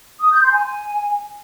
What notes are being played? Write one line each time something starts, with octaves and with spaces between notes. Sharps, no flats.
D#6
G6
C6
G#5